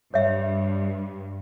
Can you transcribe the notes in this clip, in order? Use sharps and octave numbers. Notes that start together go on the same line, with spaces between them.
G2 C#5 E5